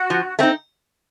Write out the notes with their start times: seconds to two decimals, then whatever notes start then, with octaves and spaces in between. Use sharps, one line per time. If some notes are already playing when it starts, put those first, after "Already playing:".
Already playing: F#4
0.10 F3
0.39 A3 C4 D#4